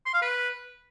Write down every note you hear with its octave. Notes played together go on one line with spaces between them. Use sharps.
C6
F5
B4